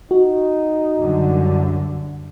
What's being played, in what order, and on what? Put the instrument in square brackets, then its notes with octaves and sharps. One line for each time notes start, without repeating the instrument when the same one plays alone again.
[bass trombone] D#4 [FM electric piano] F#4
[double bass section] C2 F#2 D3